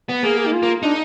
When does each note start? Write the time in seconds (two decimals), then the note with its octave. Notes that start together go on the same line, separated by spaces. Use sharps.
0.09 B3
0.23 A#3 G#4
0.38 G#4
0.47 D#4
0.53 F4
0.63 A#3
0.83 D4 D#4